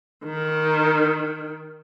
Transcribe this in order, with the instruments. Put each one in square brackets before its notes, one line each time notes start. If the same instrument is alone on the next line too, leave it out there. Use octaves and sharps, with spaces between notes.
[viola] D#3